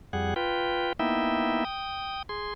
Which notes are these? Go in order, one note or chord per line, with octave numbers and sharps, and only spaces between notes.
F2 G3 G#4 F#5
F4 B4 G5
A#3 B3 D#4 E4 E5 G5
G5 D#6
G#4 C6